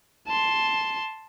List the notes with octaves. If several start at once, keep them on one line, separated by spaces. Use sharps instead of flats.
A5 C6